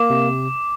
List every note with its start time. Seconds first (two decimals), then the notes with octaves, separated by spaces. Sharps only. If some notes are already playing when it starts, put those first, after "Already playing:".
Already playing: A#3 D6
0.10 C3